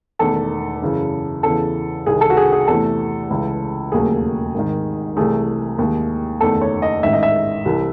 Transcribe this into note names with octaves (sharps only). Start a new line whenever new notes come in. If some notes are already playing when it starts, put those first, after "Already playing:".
E1 E2 D#3 A3 A4
F#2 C#3 E3
E2 C#3 E3 A4
C2 C3 D#3 G#4
A4
F#4
G#4
G#4
E2 C3 E3 A3 A4
C#2 C#3 E3
E1 D#2 C#3 F#3 A3 G#4
G#1 G#2 D#3
C2 C3 E3 A3 G#4
D#2 D#3 G#3
F#1 E2 D#3 A3 A4
C#5
D#5
A1 G#2 D#3 E5
D#5
E5
C2 C3 E3